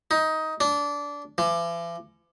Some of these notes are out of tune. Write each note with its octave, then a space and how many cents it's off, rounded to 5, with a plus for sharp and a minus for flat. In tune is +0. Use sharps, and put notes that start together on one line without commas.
D#4 +15
D4 -20
E3 +45